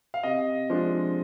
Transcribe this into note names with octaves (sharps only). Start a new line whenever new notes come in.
F5
C3 D#5
F3 G#3 D4